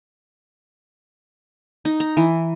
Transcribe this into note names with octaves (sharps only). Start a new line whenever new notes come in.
D#4
A#5
E3